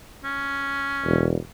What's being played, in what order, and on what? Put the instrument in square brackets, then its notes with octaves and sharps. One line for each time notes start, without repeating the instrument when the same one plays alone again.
[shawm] C#4
[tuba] E1